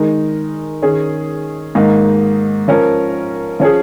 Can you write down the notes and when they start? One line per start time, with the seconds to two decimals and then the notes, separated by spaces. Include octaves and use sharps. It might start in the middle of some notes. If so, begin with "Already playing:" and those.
Already playing: D#3 G#3 D#4 A#4
0.82 D#3 C#4 G#4
1.75 G#2 D#3 A#3 D#4
2.68 F3 C#4 A#4
3.60 F3 C#4 G#4